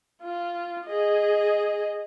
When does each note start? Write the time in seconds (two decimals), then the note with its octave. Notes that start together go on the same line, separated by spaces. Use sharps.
0.23 F4
0.86 G#4 D#5